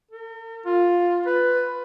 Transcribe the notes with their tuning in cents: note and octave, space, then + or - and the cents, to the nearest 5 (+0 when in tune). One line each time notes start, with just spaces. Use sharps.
A#4 -45
F4 +10
B4 +10